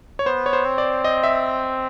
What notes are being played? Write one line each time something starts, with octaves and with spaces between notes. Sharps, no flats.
C#5
B3 C5
C#5
C5
C4
D5
D#5
E5